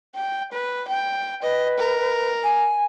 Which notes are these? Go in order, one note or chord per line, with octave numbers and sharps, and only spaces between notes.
G5
B4
G5
B4 D#5
A#4
G#5